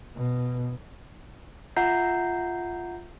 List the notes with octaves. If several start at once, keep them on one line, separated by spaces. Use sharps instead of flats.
B2
F4 E5 F#5 A#5 G6 C7